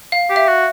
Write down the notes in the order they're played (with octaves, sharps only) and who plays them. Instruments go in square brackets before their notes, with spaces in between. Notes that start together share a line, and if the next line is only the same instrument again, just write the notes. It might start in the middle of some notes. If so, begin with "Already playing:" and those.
[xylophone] F5
[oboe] G4
[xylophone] E5
[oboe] F#4